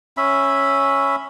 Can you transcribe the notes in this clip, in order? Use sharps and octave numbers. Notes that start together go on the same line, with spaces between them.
C#4 E5 B5